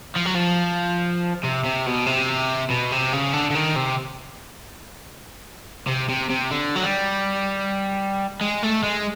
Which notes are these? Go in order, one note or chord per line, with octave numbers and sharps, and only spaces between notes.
F3
F#3
F3
C3
C3
B2
C3
B2
C3
C#3
D3
D3
D#3
C3
C3
C3
C3
D3
F#3
G3
G#3
A3
G#3